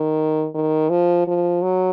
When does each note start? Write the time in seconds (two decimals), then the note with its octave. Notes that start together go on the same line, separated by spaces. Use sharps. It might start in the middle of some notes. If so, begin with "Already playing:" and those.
Already playing: D#3
0.54 D#3
0.90 F3
1.27 F3
1.63 F#3